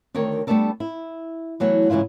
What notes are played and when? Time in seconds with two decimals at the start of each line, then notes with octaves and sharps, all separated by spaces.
0.15 D2 D#3 A#4 C#5 G5
0.47 G3 A3 B3 D4 A4 A#4
0.80 E4
1.60 E3 F#3 A3 B3
1.90 G#2 C#3 E3 E4 F4